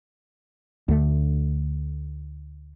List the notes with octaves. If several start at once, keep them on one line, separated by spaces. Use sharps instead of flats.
D2 D3 A3